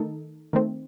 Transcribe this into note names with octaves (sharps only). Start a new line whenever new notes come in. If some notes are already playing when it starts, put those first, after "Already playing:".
Already playing: D#3 A3 D#4 A4
D#3 A3 C4